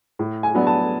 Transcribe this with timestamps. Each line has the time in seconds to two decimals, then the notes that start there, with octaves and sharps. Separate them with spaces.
0.19 A2
0.43 G#5
0.55 F#3 B3 D4
0.67 A5